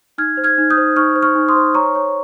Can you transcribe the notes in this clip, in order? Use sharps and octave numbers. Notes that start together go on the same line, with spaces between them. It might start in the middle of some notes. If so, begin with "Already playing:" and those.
D#4 F6 G#6
C5
F6 G#6
D#4
D#6 G6
C5
D#4 C#6 F6
C5
C#6 F6
D#4
C6 D#6
C5
C#5 A#5 C#6
C#5